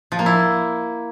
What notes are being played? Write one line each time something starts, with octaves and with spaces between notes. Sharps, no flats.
F3
A#3
E4